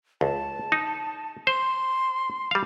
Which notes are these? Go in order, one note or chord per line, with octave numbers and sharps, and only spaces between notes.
C#2 A5
D#4
C5 C6
G3 F5